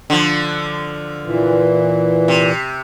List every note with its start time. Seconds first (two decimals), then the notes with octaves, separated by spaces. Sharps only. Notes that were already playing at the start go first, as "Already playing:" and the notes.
0.10 D3 F3
1.24 A#2 E3
2.28 C3